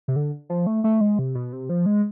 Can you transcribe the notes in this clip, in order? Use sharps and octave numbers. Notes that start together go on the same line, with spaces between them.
C3
D3
F3
A3
A3
G#3
C3
B2
C3
F3
G#3